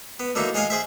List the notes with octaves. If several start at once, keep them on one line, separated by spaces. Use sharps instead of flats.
B3
D3 F#3 A#3 D#4 E4
G#3 C#5 D#5 F5 G#5
G#4 C5 E5